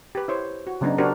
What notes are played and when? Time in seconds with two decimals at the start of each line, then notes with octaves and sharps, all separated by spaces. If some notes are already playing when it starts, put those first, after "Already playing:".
0.15 G4 B4
0.28 E4 C5 C#5
0.67 F#4
0.81 C#3 F#3 B3 D4 D#4
0.98 D4 F#4 G4 A#4 C5